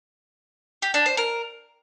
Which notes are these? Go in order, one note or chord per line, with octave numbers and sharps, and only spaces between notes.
G4
D4
C5
A#4